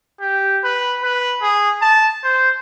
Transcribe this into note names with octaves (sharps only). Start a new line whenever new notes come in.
G4
B4
B4
G#4
A5
C5